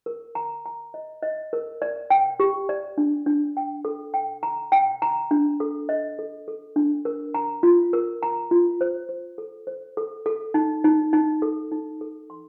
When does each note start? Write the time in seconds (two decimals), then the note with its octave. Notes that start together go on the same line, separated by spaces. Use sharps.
0.06 A#4
0.35 A#5
0.66 A#5
0.94 D#5
1.23 D#5
1.53 A#4
1.82 D5
2.10 G5
2.40 G4
2.69 D5
2.98 D4
3.26 D4
3.57 G5
3.85 A4
4.14 G5
4.43 A#5
4.72 G5
5.02 A#5
5.31 D4
5.60 A4
5.89 D#5
6.19 A4
6.48 A4
6.76 D4
7.05 A#4
7.34 A#5
7.63 F4
7.93 A#4
8.23 A#5
8.51 F4
8.81 C5
9.09 C5
9.38 A4
9.67 C5
9.97 A4
10.26 A4
10.54 D#4
10.84 D#4
11.13 D#4
11.42 A4
11.71 D#4
12.01 A4
12.30 C6